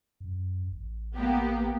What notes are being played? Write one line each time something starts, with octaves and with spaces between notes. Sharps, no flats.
F#2
A1
A#3 B3 G4